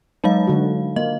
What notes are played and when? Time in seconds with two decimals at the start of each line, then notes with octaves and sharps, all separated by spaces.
0.24 F#3 G#3 D#4 F5
0.47 D3 F#4
0.96 A#3 D#5